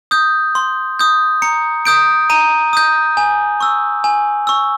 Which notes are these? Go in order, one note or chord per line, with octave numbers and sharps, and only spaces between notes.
D#6 G6
C6
D#6 G6
A#5 C#7
D#6 G6 D7
A#5 D#7
D#6 G6
G#5
C#6 E6
G#5
C#6 E6